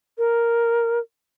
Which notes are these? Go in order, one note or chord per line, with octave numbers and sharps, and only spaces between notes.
A#4